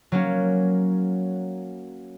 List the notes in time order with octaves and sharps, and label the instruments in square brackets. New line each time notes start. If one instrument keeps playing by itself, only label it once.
[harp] F#3 A#3 C#4